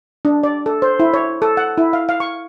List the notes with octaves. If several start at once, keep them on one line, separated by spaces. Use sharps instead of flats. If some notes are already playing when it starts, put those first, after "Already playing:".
D4
D5
A4
C5
E4
C#5
A4
F#5
E4
F5
F5
C#6